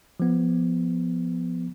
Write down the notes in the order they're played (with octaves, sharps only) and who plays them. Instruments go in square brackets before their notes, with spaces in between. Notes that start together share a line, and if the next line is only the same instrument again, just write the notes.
[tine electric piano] F3 B3